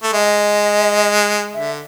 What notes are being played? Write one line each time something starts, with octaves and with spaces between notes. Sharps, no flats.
A3
G#3 D#5 E5
D3 E5